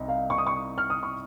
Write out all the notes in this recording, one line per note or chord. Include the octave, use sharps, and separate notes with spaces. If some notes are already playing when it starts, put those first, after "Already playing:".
Already playing: C2 C3 D#4
F5
C#6
D#6
C#6
F6
D#6
C#6